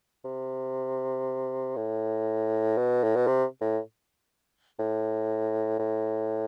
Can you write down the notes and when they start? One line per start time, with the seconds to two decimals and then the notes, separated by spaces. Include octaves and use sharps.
0.24 C3
1.76 A2
2.77 B2
3.04 A2
3.16 B2
3.27 C3
3.61 A2
4.79 A2
5.79 A2